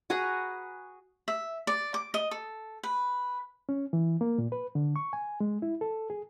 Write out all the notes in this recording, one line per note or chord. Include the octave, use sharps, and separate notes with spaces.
F#4 G#4 B4 A#5
E5
D5
D6
D#5
A4
B4
C#4
E3
A#3
A#2
B4
D3
C#6
G#5
G#3
E4
A4
G#4